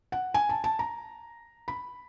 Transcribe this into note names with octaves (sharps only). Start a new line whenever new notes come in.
F#5
G#5
A5
A5
A#5
B5